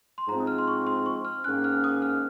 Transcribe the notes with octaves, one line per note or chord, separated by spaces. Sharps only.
C6
G#2 F3 G#3 C4 A#5
D#6
F6
C6
C#6
C6
C#6
F6
G#2 D#3 A#3 C#4 F#6
F6
D#6
F6